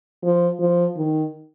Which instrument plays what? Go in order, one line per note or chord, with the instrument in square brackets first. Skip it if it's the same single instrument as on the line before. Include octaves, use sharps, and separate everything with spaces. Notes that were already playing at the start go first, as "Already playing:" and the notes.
[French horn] F3
F3
D#3